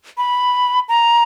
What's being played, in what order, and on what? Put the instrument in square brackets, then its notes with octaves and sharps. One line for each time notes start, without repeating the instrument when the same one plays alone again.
[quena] B5
A#5